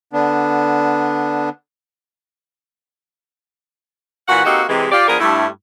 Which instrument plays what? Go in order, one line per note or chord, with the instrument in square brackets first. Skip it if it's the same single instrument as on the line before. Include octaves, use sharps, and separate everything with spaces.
[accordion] D3 B3 D4
[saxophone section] A#2 E3 F#4 F#5
A#3 C4 D#4 F#4 G4 A4
C3 E3 G#3
F4 G4 D5
F3 B3 D4 G#4 A#4
G2 A3 E4